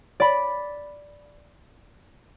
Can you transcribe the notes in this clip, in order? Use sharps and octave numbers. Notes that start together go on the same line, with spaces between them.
D5 B5